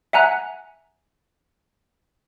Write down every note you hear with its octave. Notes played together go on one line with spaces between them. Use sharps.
E5 F#5 G#5 A#5 F#6